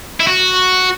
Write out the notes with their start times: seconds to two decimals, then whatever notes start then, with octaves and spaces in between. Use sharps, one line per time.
0.20 E4
0.27 F#4